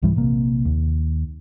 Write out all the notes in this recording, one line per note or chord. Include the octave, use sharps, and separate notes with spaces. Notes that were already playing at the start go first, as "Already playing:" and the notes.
C2 G#2 E3 G3
A#1 C3 A#3
D#2